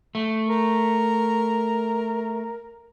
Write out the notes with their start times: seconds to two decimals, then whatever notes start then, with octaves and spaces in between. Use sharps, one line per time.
0.15 A3
0.49 A#4